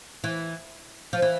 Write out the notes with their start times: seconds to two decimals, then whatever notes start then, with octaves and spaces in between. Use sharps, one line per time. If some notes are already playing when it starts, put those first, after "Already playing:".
0.24 E3
1.13 F3
1.22 E3